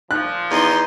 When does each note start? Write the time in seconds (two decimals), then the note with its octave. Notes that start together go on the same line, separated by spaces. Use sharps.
0.11 A#2 F3 F#6
0.51 E2 D#4 C6